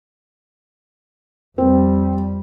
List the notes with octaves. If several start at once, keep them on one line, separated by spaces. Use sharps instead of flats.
F2 G3 C4